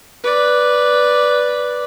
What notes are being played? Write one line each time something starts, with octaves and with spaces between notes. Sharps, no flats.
B4 D5